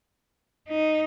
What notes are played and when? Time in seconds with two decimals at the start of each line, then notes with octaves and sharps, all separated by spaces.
0.69 D#4